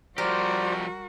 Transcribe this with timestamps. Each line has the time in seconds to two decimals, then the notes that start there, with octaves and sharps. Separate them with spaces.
0.18 F3 G3 F#4 G4 A#4 C5 D5